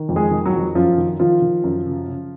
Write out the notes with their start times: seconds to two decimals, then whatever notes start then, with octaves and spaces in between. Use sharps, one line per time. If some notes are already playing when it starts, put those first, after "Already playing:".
Already playing: D#3
0.09 F2
0.16 G#3 G#4
0.31 D#3
0.45 F#3 F#4
0.53 F2
0.75 F#2 F3 F4
0.97 D#3
1.19 D#3 F3 F4
1.42 D#3
1.64 F#2
1.86 C#3
2.08 C#3